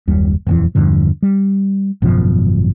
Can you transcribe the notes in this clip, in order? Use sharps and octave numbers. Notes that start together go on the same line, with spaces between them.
F#1 D#2 G3
D#1 F2 E3
E2 G2 D3 F3
G3
G#1 F#2 B2 F3